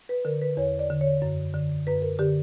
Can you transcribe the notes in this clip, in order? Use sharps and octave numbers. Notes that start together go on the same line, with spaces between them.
B4
D3 A#4
B4
E2 C#5
D5
D3
C#5
F#2
D3
F#2 B4
A#4
D3 G4